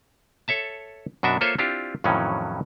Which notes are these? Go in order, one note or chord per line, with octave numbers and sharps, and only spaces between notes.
A4 C#5 E5 A5
F#2 B2 D4 F#4 E5
A#3 F4 A4 C5 C#5 E5
C4 D4 E4 F4 G4
F2 A2 D#3 E3 F#3 C#4